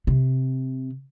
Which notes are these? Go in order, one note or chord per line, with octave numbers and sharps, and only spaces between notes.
C3